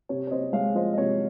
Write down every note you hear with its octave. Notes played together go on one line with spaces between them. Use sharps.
C3 C#5
C#5
C3 C5 D#5
G#3 C#5 F5
F3 C5 D#5
D#5
C3 C#5